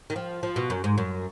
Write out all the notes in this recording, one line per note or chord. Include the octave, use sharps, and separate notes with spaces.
D#3
F3
F3
B2
F#2
G#2
F#2